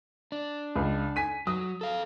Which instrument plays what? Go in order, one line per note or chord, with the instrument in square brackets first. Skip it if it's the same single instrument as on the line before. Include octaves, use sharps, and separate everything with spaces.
[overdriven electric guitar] D4
[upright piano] C#2
G#5 B6 D#7
[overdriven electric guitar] F#3 [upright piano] D#6
[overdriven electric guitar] A4 F5